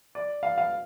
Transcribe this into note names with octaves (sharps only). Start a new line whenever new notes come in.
D5
F5
F5